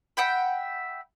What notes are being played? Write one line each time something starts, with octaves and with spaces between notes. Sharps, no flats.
E5 F#5 G5 B5